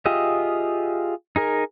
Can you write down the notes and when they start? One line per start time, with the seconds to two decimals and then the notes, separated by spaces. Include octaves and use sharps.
0.06 F4 G4 G#4 D#5 E5
1.36 D#4 G#4 A#4